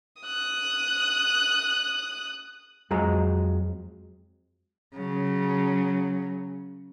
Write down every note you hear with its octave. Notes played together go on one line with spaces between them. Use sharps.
D#6 F#6
F2 F3 F#3 G#3 A#5
C#3 F#3